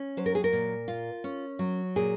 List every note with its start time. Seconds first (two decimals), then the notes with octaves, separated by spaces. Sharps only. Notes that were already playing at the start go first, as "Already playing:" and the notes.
Already playing: C#4
0.17 F#3 C5
0.26 A#4
0.35 G#4
0.44 A#4
0.53 A#2
0.88 F4
1.24 C#4
1.59 F#3
1.96 A#2 G#4